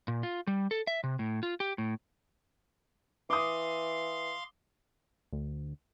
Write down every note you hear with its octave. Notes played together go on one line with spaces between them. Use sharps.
A#2
F4
G3
A4
E5
C3
A2
F4
G4
A2
E3 F5 C6 D6 D#6
D2